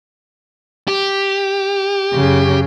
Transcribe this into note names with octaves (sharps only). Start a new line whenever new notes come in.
G4
F#2 C#3